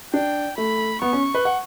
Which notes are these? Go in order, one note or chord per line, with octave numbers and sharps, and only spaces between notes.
D4 G5
A3 B5
B3 C#6
C#4
B4
F#5